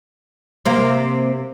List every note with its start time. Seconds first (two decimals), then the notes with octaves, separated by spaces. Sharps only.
0.65 C3 A#3